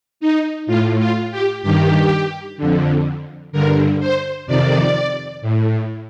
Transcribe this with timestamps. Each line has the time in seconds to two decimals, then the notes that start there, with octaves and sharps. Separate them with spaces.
0.20 D#4
0.67 A2 F4
0.99 F4
1.31 G4
1.63 G2 D#3 G4
2.57 F2 D3
3.52 G2 D3 A#4
4.00 C5
4.47 F2 C3 D#3 D5
5.42 A2